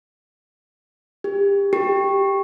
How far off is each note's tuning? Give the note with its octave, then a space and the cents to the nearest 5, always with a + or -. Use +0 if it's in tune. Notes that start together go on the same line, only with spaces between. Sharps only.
G4 +30
G4 +5